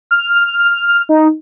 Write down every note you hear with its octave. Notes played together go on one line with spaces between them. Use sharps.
F6
D#4